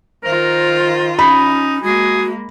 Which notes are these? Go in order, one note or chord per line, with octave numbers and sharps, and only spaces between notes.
D#3 F4 A#4 C5
C#4 D#4 B5
G#3 A#3 F#4 G#4